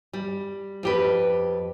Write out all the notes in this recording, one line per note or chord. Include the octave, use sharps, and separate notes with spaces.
G3
F2 G4 B4